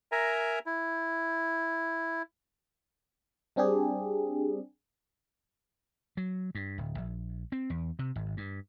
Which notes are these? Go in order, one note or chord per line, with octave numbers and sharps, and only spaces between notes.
A#4 E5 G#5 A#5
E4
G3 C4 D4 G4 G#4
F#3
G2
D1
A#1
C4
E2
C3
G#1
G2